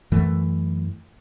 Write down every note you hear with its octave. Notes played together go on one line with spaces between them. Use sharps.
F#2 E3 A3